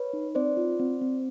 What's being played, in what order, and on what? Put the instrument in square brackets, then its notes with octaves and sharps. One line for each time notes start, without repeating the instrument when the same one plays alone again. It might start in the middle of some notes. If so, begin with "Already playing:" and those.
Already playing: [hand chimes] B4 C#5
D#4
C4 C5 D5
F4
C4
C4